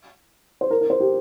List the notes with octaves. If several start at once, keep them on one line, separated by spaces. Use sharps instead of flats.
C5
A#4
A#4
C5
G4